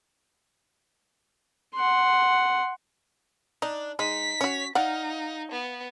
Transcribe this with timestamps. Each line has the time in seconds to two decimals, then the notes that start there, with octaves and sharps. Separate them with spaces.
1.75 F#5 C6
3.62 D4 D#4
3.99 G#3 D#4 B6
4.41 C#4 F#4 C#5
4.75 D#4 D5 F5 F#5
5.51 B3